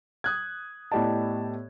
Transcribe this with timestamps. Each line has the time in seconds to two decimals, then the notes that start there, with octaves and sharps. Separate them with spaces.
0.24 D#6 F#6 G#6
0.92 A2 B3 G4 D5 D#5 A5